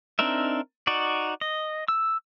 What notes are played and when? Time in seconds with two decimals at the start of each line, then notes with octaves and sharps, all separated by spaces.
0.19 C4 D4 D#4 A#4 E5
0.87 D#4 F#4 D5
1.41 D#5
1.88 E6